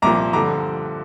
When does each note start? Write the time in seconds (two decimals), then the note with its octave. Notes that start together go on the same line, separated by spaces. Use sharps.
0.02 C2 A#2 F3 A#5 D6
0.33 G2 D3 F3 A#5 D6